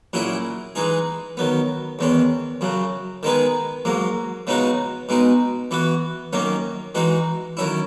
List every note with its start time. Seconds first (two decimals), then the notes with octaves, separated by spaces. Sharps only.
0.13 A#2 F#3 C#4 E4 G#4
0.75 E3 G#3 D#4 G#4
1.37 D#3 F#3 B3
1.99 E2 D#3 G#3 C#4
2.61 F#2 C#3 F#3
3.23 D#3 G#3 B3 D#4 G#4
3.85 G#2 F#3 A#3
4.47 C#3 G#3 B3 D#4 F#4
5.09 B2 G#3 D#4
5.71 E3 B3 F#4
6.33 F#2 D#3 F#3 A#3 C#4
6.95 E3 G#3 D#4 F#4
7.57 D#3 F#3 C#4 E4